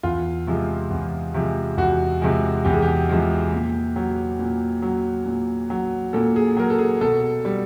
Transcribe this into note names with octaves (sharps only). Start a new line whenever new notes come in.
E2 F4
C3 F3 G#3
E2
C3 F3 G#3
E2 F#4
C3 F3 G#3
E2 G4
G#4
G4
C3 F3 G#3
A#2
F#3
A#2
F#3
A#2
F#3
A#2 A4
G#4
F#3 A#4
A4
G#4
B2 A4
G3